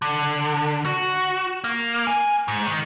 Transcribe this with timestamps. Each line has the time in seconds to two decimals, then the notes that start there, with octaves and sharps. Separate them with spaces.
0.02 D3
0.86 F#4
1.64 A#3
2.07 G#5
2.48 G#2
2.67 D#3